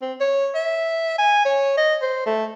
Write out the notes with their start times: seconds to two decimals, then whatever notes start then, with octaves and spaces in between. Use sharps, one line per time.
0.02 C4
0.20 C#5
0.55 E5
1.18 G#5
1.45 C#5
1.77 D#5
2.02 C5
2.26 A3